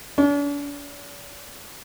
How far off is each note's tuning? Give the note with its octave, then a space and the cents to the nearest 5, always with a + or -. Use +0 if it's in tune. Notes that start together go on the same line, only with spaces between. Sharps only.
D4 -45